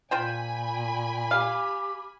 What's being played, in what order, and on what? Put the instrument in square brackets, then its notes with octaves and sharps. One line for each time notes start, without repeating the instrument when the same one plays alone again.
[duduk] A#2 [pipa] F4 C5 G5 [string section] G#5 B5
[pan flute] G4 [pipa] F5